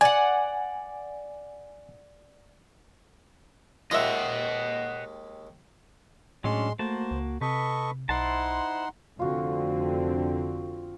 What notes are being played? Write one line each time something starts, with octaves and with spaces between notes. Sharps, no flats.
D5 F#5 G#5
D#2 G#3 F4 G4 D#5 E5 F#5
A2 F#3 G#3 C#4 D4 C6
A3 A#3 F#4 C5 A5
C#2
C3 A4 B4 D#5 C#6
B1 D#4 E4 C5 F#5 A5 C6
F1 D3 C4 F4 F#4